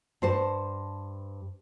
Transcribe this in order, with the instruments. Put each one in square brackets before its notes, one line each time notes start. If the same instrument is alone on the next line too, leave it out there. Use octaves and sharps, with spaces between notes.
[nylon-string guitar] G2 C5 A5